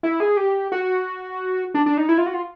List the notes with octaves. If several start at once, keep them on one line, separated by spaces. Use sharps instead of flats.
E4
G#4
G4
F#4
D4
D4
D#4
E4
F4
F#4
F4